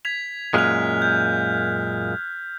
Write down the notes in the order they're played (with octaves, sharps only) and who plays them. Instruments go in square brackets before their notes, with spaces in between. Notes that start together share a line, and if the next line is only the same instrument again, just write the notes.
[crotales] G#6 B6 F7
[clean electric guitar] F#2 A#2 G#3 [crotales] F6 F#6 F7
[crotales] G6